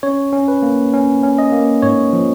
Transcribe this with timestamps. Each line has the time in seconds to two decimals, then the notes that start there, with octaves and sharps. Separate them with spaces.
0.03 C#4 C#5
0.33 C#4
0.48 B4
0.62 A#3
0.93 C#4
1.23 C#4
1.38 D#5
1.52 A#3
1.82 G#2 C#5
2.13 F3